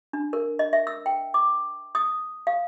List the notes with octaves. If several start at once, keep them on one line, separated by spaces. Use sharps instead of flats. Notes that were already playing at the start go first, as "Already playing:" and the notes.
D4
A#4
D#5
E5
E6
G5
D6
D#6
F5